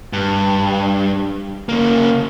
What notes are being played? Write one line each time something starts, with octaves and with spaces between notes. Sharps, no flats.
G2
C#3 A#3